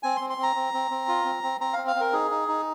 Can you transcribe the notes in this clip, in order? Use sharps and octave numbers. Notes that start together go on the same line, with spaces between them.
C4 G#5
C4 C6
C6
C4
A#5
C4
C4
C4
F4
C4
C4
C4 A#5
C4 F5
F5
C4 A#4
D#4 G#4
D#4
D#4